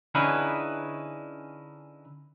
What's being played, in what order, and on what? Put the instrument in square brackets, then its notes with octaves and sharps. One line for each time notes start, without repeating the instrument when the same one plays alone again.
[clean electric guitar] D3 C#4 D#4 E4 G#4 B4